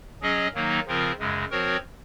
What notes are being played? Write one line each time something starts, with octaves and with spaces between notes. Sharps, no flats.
F#3 C#4 G#4 D#5
D#3 F#3 A#3 D#4
C#3 F3 C4 F4 A#4
F#2 C#3 G#3
F3 C4 F#4 A#4 C#5